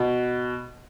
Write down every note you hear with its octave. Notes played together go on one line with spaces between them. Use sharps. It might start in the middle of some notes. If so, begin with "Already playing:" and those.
Already playing: B2